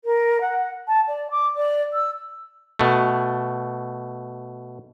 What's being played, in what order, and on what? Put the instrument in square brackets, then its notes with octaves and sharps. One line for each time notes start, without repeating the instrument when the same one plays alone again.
[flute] A#4
F#5
A5
D5
D6
D5
E6
[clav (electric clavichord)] B2 A3